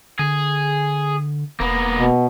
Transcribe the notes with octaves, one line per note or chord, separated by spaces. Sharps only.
D3 G#4
E1 A#3 B3
B2